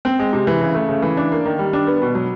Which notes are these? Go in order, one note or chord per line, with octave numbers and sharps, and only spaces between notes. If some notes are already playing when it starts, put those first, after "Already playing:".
C4
G#3
C3
E3
C#3
A3
C#3
E3
D4
A#3
D#3
G3
D4
B3
B2
F#3